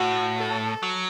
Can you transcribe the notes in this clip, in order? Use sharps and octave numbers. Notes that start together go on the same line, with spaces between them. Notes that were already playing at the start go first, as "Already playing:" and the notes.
Already playing: A2 F#4
A4
F#3